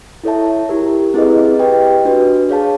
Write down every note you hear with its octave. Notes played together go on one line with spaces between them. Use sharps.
E4 A4 C#5 E5 A5
E4 G4 A#4
C4 E4 G#4 B4 D#5
G4 B4 D#5 G5
D4 F#4 B4
G#4 C#5 F5 A5